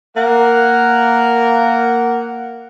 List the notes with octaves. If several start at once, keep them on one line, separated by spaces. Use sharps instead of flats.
A#3 F#5